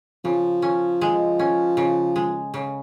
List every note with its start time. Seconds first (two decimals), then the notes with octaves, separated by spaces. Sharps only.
0.25 C#3 F3
0.62 C#4
1.01 G#3
1.39 C#4
1.77 C#3
2.16 G#3
2.54 C#3